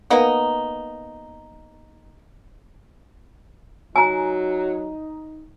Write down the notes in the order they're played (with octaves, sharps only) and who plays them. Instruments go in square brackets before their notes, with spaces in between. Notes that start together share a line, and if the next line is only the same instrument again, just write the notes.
[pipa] A#3 B3 D#4
[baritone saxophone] F#3 [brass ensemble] D#4 [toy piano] G#5 A#5